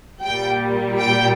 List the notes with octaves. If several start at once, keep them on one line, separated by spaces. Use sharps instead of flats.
A#2 G3 G5
G5